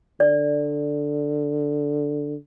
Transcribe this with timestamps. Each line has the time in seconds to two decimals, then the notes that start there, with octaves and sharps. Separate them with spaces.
0.20 D3 D5